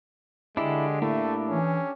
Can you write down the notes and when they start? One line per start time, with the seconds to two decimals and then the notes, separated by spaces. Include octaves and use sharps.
0.57 D3 G#3 D4 E4 G4 A4
1.02 A2 A3 A#3 E4
1.49 E3 C#4